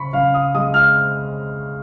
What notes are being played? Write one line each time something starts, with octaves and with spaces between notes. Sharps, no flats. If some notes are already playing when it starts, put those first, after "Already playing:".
Already playing: C#3 C#4 B5 C#6
C#3 F5
D#6
G#3 D#6
F6